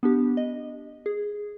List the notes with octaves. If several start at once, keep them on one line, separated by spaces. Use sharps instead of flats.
B3 D4 G4
D#5
G#4